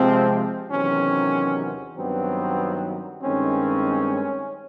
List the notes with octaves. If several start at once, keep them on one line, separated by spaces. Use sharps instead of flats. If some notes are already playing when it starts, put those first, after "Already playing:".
Already playing: C3 F3 G#3 C4
E2 C3 D#3 F#3 C#4
G2 D#3 F#3 B3 C4
G2 D#3 G#3 C4 C#4